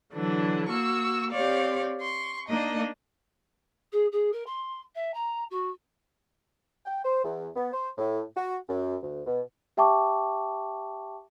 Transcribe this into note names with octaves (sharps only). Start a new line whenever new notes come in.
D3 E3 F#3 D4
A#3 F#4 C#6 E6
C4 G4 C#5 D5 F5
C6 C#6
A#3 D4 D#4 D#5
G#4
G#4
A#4
C6
E5
A#5
F#4
G5
C5
E2
B3
C5
A2
F#4
F#2
D2
B2
G4 E5 G5 A5 C#6 D6